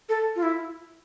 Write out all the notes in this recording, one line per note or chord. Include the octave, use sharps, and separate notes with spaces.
A4
F4
E4